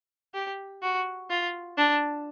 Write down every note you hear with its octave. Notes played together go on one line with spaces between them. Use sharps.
G4
F#4
F4
D4